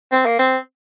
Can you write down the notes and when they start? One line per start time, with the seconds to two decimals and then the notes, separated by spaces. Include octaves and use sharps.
0.12 C4
0.26 A#3
0.39 C4